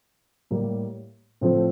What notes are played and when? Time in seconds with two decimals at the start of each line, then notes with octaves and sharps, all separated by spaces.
0.51 A2 G3 A#3
1.41 A2 F3 A3 C4